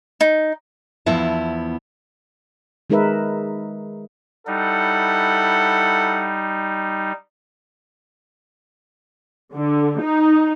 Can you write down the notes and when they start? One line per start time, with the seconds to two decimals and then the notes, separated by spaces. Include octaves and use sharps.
0.21 D#4
1.06 E2 F3 B3 E4 A5
2.90 D#3 G#3 D#4 A#4 B4 E5
4.47 G3 D#4 E4 A4 F#5
9.54 D3
10.02 D#4